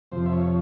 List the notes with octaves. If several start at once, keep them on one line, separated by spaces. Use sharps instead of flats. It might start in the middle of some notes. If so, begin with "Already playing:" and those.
F2 C3 F3 C5
E5
C#5